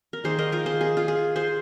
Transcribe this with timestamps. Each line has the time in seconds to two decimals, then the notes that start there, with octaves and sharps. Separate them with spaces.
0.13 A#4
0.24 D#3 A#3 D#4 G#4 C5
0.39 A#4 D#5
0.52 F4 A#4
0.66 G#4 C5
0.81 G#4
0.97 F4
1.08 G#4
1.36 G#4 C5